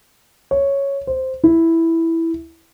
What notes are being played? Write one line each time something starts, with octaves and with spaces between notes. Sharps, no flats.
C#5
C5
E4